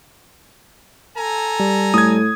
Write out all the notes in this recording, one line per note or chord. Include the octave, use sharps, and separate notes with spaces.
A4 G#5 A#5
G3
A2 D#6 G#6